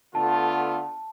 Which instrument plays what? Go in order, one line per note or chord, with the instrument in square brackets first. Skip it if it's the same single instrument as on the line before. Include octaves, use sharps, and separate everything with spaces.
[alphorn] D3 [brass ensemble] A3 B3 F4 [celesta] A5